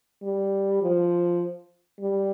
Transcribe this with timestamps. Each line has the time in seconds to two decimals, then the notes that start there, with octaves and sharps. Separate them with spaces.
0.23 G3
0.82 F3
2.00 G3